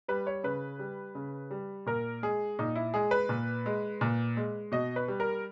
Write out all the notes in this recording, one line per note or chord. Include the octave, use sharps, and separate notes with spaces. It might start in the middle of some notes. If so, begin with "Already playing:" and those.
G3 B4
C#5
C#3 B4
G3
C#3
G3
A#2 A#4
G#3 G#4
A#2 D#4
E4
G#3 G#4
B4
A#2
G#3
A#2
G#3
B2 D#5
B4
G3
A#4